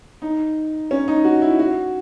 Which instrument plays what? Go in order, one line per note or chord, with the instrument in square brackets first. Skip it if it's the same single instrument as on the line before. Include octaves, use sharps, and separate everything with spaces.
[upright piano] D#4
C#4
D#4
F#4
E4
F#4